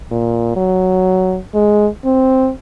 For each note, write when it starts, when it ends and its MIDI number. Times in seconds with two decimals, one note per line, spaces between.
0.11 0.56 46
0.56 1.39 54
1.54 1.88 56
2.05 2.51 60